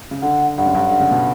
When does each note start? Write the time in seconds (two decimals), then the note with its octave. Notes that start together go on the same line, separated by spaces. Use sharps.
0.11 C#3
0.22 D3 F#5
0.57 G2 F#5
0.65 F#2
0.75 G2
0.90 D3
1.00 C#3
1.11 B2